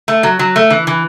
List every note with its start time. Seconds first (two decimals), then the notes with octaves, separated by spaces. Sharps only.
0.08 A3
0.23 F#3
0.39 F#3
0.56 A3
0.70 E3
0.87 E3